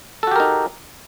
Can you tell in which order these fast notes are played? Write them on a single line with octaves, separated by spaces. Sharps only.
A4 F#4 G4 A#4 D#4